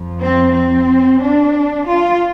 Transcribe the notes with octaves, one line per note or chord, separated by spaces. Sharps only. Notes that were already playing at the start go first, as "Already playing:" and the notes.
Already playing: F2 F3
C4
C4
D4
F4